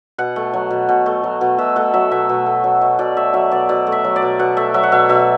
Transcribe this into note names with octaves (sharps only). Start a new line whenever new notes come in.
B2 F#5
A3
F#3
B2
B2
A3
F#3
B2
B2 E5
A3 F#5
F#3 E5
B2 E5
B2
A3
F#3
B2
B2 D5
A3 E5
F#3 E5
B2 D5
B2 D5
A3
E5
F#3
D5
B2
B2 F#5
A3 E5
F#3 E5
F#5
B2 E5
B2 E5